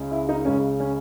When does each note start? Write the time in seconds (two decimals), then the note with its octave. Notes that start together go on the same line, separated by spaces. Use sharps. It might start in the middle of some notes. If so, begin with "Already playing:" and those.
Already playing: C#2 C#3 G#3
0.11 E4
0.29 D#4
0.45 C#2 C#3 G#3 C#4
0.80 C#4